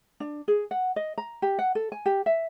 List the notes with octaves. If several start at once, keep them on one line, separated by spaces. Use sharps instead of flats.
D4
G#4
F#5
D#5
A#5
G4
F#5
A4
G#5
G4
E5